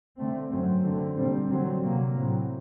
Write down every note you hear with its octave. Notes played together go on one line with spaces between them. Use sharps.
D3 A3 C4
F#2 F#3 C4
D3 A3 C4
A#2 G3 C4
D3 F#3 C4
C3 F#3 A#3
A2 F#3 C4